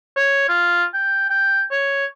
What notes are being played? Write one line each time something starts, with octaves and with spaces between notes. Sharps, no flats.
C#5
F4
G5
G5
C#5